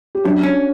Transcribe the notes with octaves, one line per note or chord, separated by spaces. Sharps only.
G4
F#2 D4 F#4
C#4